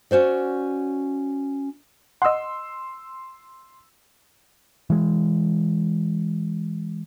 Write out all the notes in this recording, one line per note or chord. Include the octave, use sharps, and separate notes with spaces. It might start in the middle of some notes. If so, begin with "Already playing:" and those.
C#4 F#4 C5 D5
D#5 F#5 C6 E6
E3 G#3